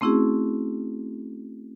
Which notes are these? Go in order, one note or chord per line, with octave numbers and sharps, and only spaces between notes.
A3 C4 C#4 E4 F#4 G#4